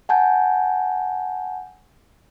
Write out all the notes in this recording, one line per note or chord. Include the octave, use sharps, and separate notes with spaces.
F#5 G#5 A5 G6